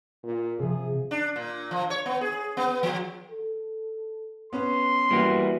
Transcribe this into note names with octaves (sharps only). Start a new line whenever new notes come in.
A#2
C3 F3 G#4
D4
A#2
F3
C#5
B3
G#4
B3
F3
A4
B3 C#4 B4 C6
E3 G3 A#3 F#4